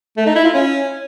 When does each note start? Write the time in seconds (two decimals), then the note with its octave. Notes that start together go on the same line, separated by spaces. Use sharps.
0.17 A3
0.26 D#4
0.36 E4
0.45 F4
0.54 C#4